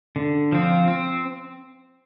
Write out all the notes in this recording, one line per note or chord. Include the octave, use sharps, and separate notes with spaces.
D3
F3 C4
C4